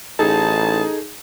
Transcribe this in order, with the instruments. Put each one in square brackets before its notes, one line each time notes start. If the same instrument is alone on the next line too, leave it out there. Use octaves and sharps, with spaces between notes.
[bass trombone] A1 [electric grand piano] D#4 G#4 [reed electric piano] A4 [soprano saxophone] A5